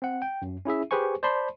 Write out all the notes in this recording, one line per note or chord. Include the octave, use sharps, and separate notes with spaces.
C4 F#5
G5
F#2
C#4 E4 G#4 E5
G4 G#4 B4 C5 G#5 C#6
C5 D5 A5 B5 C6